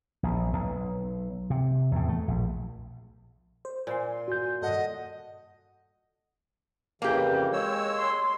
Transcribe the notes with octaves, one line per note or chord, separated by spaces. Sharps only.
A#1
B1
C3
E2 A2
A3
A#1
C5
A#2 G#5 C6
F#4 G6
G2 A4 D#5 F#5
F2 C#3 E3 A#3 G4
G#3 C#5 E6
C6